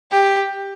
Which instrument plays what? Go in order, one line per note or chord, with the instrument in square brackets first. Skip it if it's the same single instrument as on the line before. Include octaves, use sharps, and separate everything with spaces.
[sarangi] G4